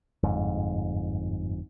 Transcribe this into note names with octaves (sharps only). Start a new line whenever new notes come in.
G1 F2 G#2